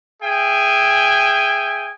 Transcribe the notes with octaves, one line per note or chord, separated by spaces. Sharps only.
G#4 E5 G5 G#5